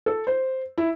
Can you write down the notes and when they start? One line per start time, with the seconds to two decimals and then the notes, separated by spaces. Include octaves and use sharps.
0.06 A4
0.27 C5
0.78 E4